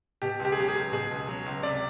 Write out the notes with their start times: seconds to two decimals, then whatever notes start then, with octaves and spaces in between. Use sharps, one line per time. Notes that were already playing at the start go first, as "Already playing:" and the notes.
0.22 B2 G4
0.40 C#2
0.45 G4
0.52 G#4
0.57 F#3 G4
0.68 G#4
0.75 C#2
0.93 B2 G#4
1.11 C#2
1.27 F#3
1.46 C#2
1.63 C3 D5